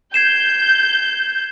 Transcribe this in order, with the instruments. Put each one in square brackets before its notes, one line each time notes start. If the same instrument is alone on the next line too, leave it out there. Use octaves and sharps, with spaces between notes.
[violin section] G6 [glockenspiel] G#6 C7 E7